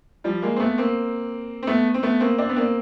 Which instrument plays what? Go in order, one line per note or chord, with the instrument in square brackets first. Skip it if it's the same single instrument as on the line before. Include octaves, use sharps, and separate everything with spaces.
[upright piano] F3 G3
G#3 A#3
C4
A3 B3
A#3 C4
C4
A3 B3
C4
A3 B3
A#3 C4
C4 D4
B3
A#3 C4